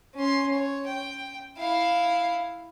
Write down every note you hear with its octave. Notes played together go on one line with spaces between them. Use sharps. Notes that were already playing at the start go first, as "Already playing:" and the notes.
C#4 C6
C#5
G5
E4 F5